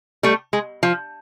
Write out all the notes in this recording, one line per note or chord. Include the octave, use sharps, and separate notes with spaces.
G3 A3
G#3
F3